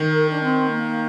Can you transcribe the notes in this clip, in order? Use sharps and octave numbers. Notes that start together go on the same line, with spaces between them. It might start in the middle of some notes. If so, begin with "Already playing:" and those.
Already playing: D#3
A#4
D4
C4
A#3